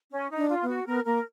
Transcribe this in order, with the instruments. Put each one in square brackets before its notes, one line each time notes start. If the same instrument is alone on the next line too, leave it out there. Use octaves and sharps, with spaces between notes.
[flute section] C#4
D#4
[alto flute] D4
[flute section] F4
[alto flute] B3
[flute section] F#4
[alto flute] B3 [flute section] A#4
[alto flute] A#3 [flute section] A#4